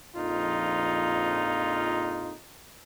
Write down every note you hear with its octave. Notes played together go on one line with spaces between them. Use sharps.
A#1 F2 D#4 F4